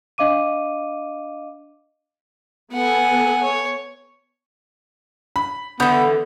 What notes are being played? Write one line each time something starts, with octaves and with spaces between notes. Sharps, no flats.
D4 D#5 F5 D6 D#7
B3 A4 F#5 G#5
C#5
B5
D3 E3 B3 D#6 G6